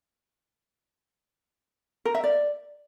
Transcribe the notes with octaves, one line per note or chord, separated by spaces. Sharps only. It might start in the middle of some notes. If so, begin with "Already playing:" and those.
A#4
E5
D5